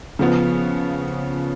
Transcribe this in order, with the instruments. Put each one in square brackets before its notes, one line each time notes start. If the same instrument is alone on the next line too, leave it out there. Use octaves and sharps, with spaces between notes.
[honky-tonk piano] C#3 F3 B3